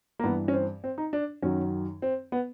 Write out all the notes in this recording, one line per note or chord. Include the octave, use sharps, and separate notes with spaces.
A#3
G2 E3 B3
C#4
C4
C4
D#4
D4
F#2 D#3 F#3 C#4
C4
B3